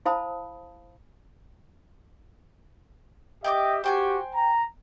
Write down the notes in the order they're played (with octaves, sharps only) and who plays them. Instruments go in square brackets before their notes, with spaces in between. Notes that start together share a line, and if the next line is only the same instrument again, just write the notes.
[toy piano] E4 C5 F5 A5 B5 D#6
[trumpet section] G4 D#5 E5 [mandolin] G5 A5 D6
[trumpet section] F#4 G4 [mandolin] C5 G5 G#5
[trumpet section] A#5